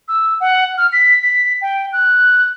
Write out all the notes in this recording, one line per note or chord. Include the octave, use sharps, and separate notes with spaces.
E6
F#5
F6
B6
B6
G5
F#6